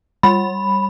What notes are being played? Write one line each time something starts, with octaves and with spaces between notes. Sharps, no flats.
G3 B5